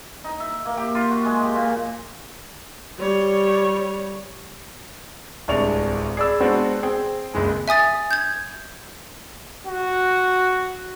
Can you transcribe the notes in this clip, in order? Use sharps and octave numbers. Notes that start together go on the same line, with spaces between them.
D#4
E5
A#3
G4
F4
F#4
G#3
G4
A#2
G3 C#5
D1 C2 G#3 D4 C#6 F7
G#4 D5 B5 E6
G#3 B3 C4 D4 F#4
C4 G#4 G5
F#1 C#2 C#3 G#3 G#5
E5 G#5 D#6 A6
G6 G#6
F#4